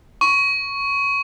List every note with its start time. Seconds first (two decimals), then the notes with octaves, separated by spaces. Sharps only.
0.21 C#6